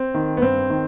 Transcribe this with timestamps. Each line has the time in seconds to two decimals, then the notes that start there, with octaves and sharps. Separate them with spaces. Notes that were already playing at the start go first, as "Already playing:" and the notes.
Already playing: C4
0.14 D#3
0.37 B3
0.42 G2 C4
0.70 D#3